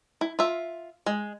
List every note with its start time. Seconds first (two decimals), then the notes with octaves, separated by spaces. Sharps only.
0.21 E4
0.39 F4 E5
1.06 G#3